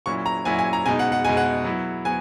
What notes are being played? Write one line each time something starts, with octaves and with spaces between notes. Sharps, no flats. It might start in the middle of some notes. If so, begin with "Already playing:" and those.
A#2 F#3 C#4 E4 C#6
A#5
A#2 F#3 C#4 E4 G#5
G#5
A#5
B2 G#3 D#4 G#5
F#5
F#5
B2 G#3 D#4 G#5
F#5
F#3 B3 E4
F#3 B3 G#5